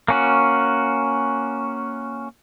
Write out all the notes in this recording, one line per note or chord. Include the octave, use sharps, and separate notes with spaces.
A#3 C#4 F#4